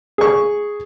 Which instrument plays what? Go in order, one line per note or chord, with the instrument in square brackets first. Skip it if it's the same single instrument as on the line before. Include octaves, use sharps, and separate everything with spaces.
[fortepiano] G#4 C#6